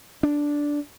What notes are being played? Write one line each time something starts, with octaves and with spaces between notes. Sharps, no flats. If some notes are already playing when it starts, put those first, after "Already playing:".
D4